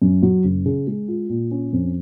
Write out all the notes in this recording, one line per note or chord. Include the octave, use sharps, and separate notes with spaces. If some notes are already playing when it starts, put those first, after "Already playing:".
F#2
F#3
F#1
C#3
G#3
F4
A#2
C#4
F2